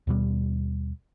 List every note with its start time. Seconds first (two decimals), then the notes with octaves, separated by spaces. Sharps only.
0.07 D#2 B2 G3